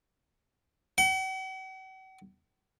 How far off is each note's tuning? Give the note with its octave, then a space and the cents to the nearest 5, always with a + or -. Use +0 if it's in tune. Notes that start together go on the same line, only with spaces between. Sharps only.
F#5 +45